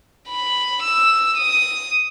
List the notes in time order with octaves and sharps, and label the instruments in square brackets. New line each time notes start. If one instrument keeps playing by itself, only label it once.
[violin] B5
E6
D#6